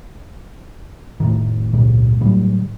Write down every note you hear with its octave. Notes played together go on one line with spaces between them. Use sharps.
F1 C2 A2 D#3
G#1 C#2 A#2 G#3
A2 D3 F#3 G3